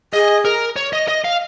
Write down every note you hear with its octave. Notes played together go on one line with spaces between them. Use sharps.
G#4 D#5
A#4
C#5
D#5
D#5
F5